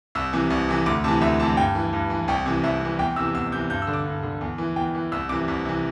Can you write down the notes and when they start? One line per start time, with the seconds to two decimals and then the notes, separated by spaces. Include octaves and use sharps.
0.15 C2 E6
0.33 C3 E3
0.50 C2
0.69 C3 E3
0.86 D2 D6
1.04 C3 E3 A5
1.21 D2 E5
1.40 C3 E3 A5
1.57 G2 G5
1.75 E3
1.93 G2
2.10 E3
2.28 C2 G5
2.46 C3 E3
2.64 C2 E5
2.81 C3 E3
2.99 E2 G5
3.16 C3 E3 E6
3.35 E2 E6
3.52 C3 E3 G6
3.70 G2 G6
3.82 E6
3.87 D3
3.93 D6
4.06 G2
4.23 D3
4.41 E2
4.58 E3
4.76 E2 G5
4.95 E3
5.12 C2 E6
5.29 C3 E3 D6
5.48 C2
5.65 C3 E3